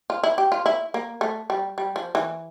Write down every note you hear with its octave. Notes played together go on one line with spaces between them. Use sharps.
F4
E4
G4
F4
E4
A#3
A3
G3
G3
F3
E3